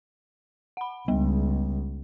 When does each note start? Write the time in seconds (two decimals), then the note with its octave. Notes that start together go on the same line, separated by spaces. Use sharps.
0.77 F#5 B5
1.08 C#2 G3 B3